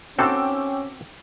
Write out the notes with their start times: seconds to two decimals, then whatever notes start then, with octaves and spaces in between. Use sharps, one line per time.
0.19 C4 C#4 F#4 A4 G5 D6 E6